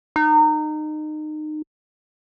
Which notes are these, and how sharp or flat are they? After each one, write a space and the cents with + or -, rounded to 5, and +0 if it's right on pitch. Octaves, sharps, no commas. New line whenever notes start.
D#4 -25